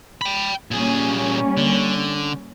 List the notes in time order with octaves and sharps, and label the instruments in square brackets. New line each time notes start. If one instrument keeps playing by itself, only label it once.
[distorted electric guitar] G5 B5
[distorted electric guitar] A#2 G#4 [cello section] G3 A#3 C#4
[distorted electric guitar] D3